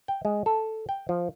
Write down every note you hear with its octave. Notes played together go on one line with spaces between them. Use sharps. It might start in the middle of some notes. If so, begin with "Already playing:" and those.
G5
G#3
A4
G5
F3